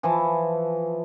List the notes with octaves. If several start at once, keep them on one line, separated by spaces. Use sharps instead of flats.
E3 F3 A5